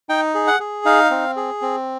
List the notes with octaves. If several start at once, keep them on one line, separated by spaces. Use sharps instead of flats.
D#4 G5
G#4
F#5
G#4
D#4 F5
C4
G#4
C4